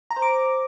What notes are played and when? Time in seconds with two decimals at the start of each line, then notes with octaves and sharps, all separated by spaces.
0.11 A#5
0.16 C5
0.22 D6